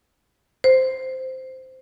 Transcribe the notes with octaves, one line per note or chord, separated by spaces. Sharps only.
C5